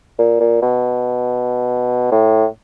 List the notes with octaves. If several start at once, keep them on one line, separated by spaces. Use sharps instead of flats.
A#2
A#2
B2
A2